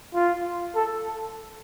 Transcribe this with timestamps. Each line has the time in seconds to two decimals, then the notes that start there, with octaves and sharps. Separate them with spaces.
0.14 F4
0.75 A4